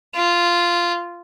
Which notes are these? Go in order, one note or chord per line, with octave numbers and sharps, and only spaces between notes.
F4